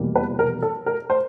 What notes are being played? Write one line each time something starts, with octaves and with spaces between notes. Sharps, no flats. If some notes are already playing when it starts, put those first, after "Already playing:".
Already playing: F1 E2 B2 G3 A#3
B4
A#4
A4
A#4
C5